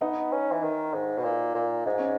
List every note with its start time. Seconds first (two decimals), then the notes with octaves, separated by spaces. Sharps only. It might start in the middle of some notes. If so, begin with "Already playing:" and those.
0.01 B3 D#4
0.32 C#4
0.52 E3
0.63 D#3
0.94 G#2
1.17 B2
1.24 A#2
1.55 A#2
1.86 G#2 D#4
1.99 C#4